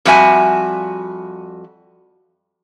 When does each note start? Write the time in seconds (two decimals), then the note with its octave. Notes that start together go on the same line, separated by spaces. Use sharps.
0.05 F2 G3 F#4 E5 G#5